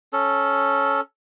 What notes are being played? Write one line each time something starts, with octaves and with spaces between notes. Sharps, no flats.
C#4 A4